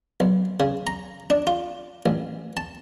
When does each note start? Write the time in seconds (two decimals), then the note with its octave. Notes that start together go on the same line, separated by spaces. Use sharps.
0.20 B1
0.60 C#3
0.87 A#5
1.30 D4
1.47 F4
2.06 A1
2.57 A5